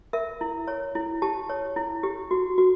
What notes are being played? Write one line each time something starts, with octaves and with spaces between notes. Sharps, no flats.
A#4 E5
E4
C#5
E4
G4 A5
C#5
E4
G4
F#4
F#4